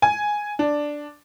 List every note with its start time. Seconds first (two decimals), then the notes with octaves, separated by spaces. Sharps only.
0.02 G#5
0.59 D4